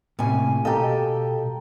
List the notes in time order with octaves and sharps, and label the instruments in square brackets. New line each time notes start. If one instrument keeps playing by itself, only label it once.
[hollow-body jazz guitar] A2 C3 A#3 [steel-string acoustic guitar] C#4 G#5
[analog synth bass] B2 [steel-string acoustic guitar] G4 A4 [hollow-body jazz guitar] D#5 [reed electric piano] F5 G5 A#5